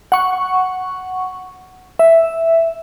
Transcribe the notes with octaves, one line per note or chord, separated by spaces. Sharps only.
F#5 C#6
E5